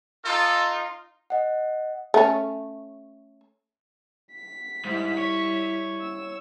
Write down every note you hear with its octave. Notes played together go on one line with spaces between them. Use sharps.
D#4 F4 A4
D#5 F#5
A3 C#4
B6
G#2 G3 E4
C#5
E6